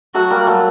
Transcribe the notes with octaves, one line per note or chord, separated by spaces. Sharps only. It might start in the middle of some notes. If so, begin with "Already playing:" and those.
F#3 A3 F#4
G3 A#3
F#3 A3